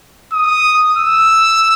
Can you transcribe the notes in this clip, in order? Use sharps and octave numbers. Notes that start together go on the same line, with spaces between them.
D#6
E6